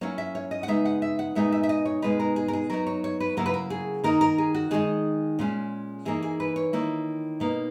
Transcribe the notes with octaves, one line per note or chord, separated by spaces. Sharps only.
F#3 A#3 C#4 E4 C#5
E5
C#5
D#5
F#5
C#3 G#3 B3 D#4 E5
F#5
E5
F#5
A#2 G#3 B3 D#4 E5
E5
E5
D#5
C#5
B2 G#3 B3 D#4 B4
A#4
G#4
A#4
G#4
F#3 B3 D#4 A#4
C#5
C#5
B4
C#3 F#3 A#3 E4 A#4
B4
A#4
G#4
D#3 A#3 D#4 A#4
A#4
G#4
F#4
D#3 G#3 D#4 G#4
A#2 G#3 C#4
E3 A#3 D#4 G#4
G#4
B4
C#5
D#3 A#3 E4
B2 A#3 D#4